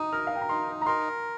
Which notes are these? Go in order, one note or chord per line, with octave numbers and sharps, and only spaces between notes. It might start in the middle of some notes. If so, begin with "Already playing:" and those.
Already playing: D#4 D#6
A#4 F6
F5
G5
A#5
D#4 C6
A#5
A#4 C6